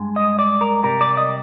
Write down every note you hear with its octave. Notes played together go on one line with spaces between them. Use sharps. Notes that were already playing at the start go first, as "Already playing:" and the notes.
Already playing: G2 G#3
D#5
D5
A#4
C3 G3 A#4
D5
D#5